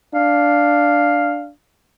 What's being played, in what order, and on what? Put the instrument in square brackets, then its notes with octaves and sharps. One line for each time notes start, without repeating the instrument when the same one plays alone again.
[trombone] D4 [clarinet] F5